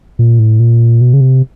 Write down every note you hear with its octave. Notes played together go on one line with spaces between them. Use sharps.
A#2
A2
A#2
B2
C#3
C3